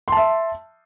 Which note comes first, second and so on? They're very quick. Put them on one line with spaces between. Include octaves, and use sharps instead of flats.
C6 A5 E5